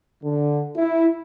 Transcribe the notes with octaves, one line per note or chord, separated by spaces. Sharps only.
D3
E4